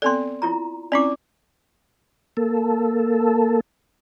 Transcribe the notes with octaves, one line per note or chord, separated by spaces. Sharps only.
B3 C4 A4 D5 C6
E4 F4 A#5
C4 C#4 E4 D5 D6
A#3 A4